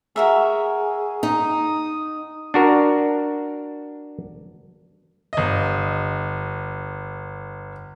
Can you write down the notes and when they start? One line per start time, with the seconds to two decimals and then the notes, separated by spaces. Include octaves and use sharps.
0.16 F#4 G#4 A#4 E5
1.23 D#4 D#6
2.54 D4 F#4 A#4
5.33 G1 D#5